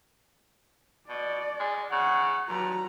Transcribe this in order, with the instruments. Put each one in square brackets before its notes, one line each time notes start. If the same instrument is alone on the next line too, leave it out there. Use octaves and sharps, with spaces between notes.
[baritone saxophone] B2 [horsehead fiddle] D5
[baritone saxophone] G#3
[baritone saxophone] C#3 [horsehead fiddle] F#5
[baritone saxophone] G2 [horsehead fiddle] F#3 A#5